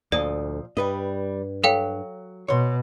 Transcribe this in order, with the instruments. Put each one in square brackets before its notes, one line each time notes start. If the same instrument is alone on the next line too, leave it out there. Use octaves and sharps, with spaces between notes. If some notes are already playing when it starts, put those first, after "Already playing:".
[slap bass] D2 [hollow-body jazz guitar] A#2 F3 D#5 [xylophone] D5
[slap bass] G2 [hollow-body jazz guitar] G3 B4 D#5
[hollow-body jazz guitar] F#3 [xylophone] A4 F5 G5
[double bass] B2 [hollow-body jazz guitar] C#5 C6